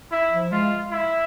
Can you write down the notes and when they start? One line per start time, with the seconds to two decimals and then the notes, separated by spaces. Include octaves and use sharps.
0.12 E4
0.32 F3
0.52 G#3 F4
0.91 E4